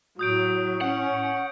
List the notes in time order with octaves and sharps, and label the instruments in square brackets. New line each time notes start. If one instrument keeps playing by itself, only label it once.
[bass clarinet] A2 [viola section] F#3 [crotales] D#6 G6 D7
[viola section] C#4 [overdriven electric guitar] F#5